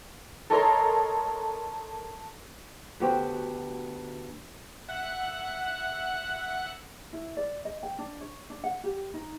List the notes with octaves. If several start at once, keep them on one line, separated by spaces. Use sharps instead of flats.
A4 A#4 C#5 D#5 A#5 C6
D2 B3 F#4 G4 C5
E5 F#5 F#6
E4
D5
D#5
G5
D4
C#5
D4
F#5
G4
D#4